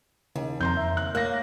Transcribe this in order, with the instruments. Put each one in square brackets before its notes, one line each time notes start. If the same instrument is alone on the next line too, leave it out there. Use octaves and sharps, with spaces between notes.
[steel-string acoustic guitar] D#2 [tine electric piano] C#3
[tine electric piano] F2 [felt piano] A#5 C6 G6
[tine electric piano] E5
[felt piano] F#6
[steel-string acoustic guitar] A#3 [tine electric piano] C#5 [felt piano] F#6 A#6